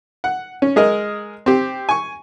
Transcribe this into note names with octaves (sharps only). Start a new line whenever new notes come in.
F#5
C#4
G#3 G#4 A#4 D#5
C4 G4
G#5 C#6